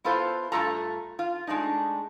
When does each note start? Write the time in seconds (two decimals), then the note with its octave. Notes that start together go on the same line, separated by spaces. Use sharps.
0.04 B3 E4 F4 A4 C5
0.52 G2 A3 F4 A4 A#5
1.19 F4
1.47 G#3 A3 D4 D#4